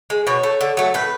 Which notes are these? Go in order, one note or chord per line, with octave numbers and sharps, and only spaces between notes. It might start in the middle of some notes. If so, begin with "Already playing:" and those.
G#3
B2 C#5
A3
D3
F#3 A3
A2 B4